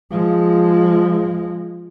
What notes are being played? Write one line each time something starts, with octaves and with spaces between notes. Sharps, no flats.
F3 G#3